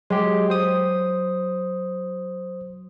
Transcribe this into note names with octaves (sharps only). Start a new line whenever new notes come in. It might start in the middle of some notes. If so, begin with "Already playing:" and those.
F#3 G#3 G4
C5 D#6